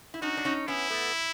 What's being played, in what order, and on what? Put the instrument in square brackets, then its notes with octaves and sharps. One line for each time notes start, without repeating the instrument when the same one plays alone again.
[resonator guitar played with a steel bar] E4
[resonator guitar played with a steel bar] C#4 D#4 [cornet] F#4
[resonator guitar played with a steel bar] D4
C#4 D#4
[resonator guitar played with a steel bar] B3 C#4 [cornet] E4
[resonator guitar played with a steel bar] A3 B3